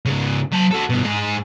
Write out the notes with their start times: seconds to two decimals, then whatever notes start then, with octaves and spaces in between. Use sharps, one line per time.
0.06 G#2 C#3
0.52 F#3 A5
0.71 F#4 A4
0.90 G2 B2
1.03 G#2 G#4